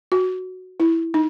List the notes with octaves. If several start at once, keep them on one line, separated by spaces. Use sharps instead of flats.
F#4
E4
D#4